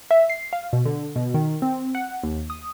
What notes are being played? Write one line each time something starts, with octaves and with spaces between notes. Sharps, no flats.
E5
C7
F5
B2
D3
B2
D#3
C4
F#5
D#2
D#6